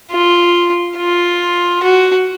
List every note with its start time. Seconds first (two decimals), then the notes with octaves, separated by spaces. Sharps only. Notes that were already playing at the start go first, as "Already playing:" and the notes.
0.11 F4
0.97 F4
1.84 F#4